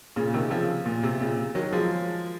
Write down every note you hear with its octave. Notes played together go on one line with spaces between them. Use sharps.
A#2 C#3
C#3
C3 D#3
C#3 F3
A#2
C3
A#2 C#3
D#3 F#3
F3 G#3